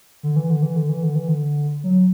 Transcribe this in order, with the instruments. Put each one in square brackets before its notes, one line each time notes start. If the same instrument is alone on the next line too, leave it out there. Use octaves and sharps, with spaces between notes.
[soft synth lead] D3
E3
D3
E3
D3
E3
D3
E3
D3
F#3